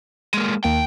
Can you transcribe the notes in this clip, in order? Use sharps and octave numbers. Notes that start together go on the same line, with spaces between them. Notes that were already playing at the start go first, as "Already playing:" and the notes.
G#3 A#3
D#2 A#3 G5 A5